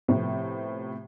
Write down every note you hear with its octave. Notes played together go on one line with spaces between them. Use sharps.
A2 C3 F3 B3 C4